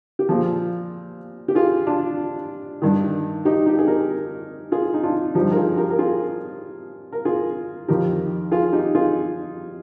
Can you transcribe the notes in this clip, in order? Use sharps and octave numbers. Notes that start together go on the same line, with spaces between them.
G4
A#2 F3 F4 G#4
G4
F4 G#4
D4 F4
G2 D#3
D#4 G4
D#4 G4
G#4
G4 A#4
F4 G#4
D#4
D4 F4
G2 F3 D#4 G4
A#4
F4 G#4
G4 A#4
A#4
F4 G#4
A#4
F4 G#4
F2 D#3 G4 A#4
F4 G#4
D#4 G4
F4 G#4